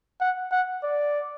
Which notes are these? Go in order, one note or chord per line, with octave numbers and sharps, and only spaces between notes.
F#5
F#5
D5